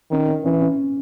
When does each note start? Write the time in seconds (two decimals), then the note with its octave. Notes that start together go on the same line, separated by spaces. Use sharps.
0.11 D#3 C#4
0.28 C#4
0.44 E3 C#4
0.61 C#4